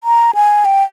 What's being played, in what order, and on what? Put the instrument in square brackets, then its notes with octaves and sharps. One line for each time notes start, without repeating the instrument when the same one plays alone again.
[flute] A#5
G#5
G5